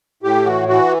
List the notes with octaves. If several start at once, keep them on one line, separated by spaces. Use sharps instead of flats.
A2 G4
E3 F#4
E3 F#4